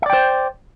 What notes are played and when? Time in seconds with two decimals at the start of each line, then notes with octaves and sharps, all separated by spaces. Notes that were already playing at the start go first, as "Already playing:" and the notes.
0.02 E5
0.06 D5
0.10 G5
0.13 C5